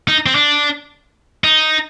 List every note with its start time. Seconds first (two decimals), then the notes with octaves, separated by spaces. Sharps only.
0.08 D#4
0.26 C4
0.35 D4
1.44 D#4